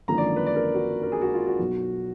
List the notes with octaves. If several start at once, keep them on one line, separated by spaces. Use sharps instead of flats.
G#1 F#2 D3 F3 A#3 A#5
D5
B4
D5
A#4
F#4
A#4
G#4
F#4
F4
F#4
B1 B2 F#3